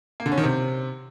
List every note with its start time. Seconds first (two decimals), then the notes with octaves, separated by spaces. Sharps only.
0.20 A#3
0.26 D3
0.32 C#4
0.38 D#3
0.43 C3